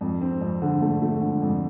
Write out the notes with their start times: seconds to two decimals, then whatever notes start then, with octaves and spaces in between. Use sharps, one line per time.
0.01 F2
0.21 C4
0.41 F2
0.62 D3
0.81 A3
1.02 A3
1.21 D3
1.42 F2